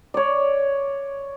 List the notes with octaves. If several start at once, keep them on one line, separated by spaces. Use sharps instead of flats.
C#5 D5